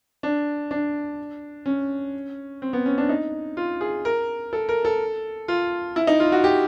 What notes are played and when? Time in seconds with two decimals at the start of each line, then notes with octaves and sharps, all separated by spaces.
0.23 D4
0.71 D4
1.66 C#4
2.62 C4
2.73 B3
2.86 C#4
2.98 D4
3.09 D#4
3.57 F4
3.81 G#4
4.05 A#4
4.53 A4
4.69 A#4
4.85 A4
5.48 F4
5.96 E4
6.07 D#4
6.20 F4
6.32 F#4
6.44 G4